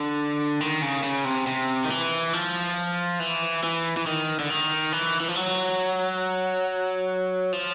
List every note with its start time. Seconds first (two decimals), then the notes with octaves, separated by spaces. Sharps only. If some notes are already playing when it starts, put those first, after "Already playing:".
Already playing: D3
0.60 D#3
0.82 C#3
1.03 C#3
1.25 C3
1.47 C3
1.85 D#3
1.90 E3
2.33 F3
3.20 E3
3.64 E3
3.97 E3
4.07 D#3
4.39 D3
4.50 D#3
4.93 E3
5.20 E3
5.28 F3
5.36 F#3
7.53 F3